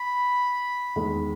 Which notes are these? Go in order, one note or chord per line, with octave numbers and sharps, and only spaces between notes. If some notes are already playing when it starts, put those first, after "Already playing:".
Already playing: B5
E2 D#3 G#3